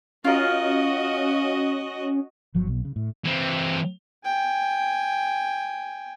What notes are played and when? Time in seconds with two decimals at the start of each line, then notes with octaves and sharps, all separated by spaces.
0.24 C#4 F4 F#4 A#4 D#5
2.54 G1 F3 F#3
2.67 B1 B2
2.85 C#3
2.96 A2
3.25 E3 C4
4.25 G5 G#5